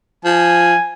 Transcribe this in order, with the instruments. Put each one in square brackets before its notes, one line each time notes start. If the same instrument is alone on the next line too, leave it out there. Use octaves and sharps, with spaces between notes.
[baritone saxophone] F3 [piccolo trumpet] G#5